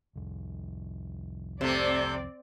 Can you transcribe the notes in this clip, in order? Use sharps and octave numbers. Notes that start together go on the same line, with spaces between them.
C2 F2
C3 A3 C4 D5